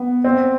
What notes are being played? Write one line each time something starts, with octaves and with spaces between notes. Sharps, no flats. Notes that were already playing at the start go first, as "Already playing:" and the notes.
Already playing: B3
C4